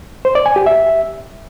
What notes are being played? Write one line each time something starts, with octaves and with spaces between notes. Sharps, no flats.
C5
D5
G#5
G4
E5